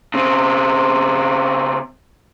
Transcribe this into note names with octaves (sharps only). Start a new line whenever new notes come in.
C#3 C4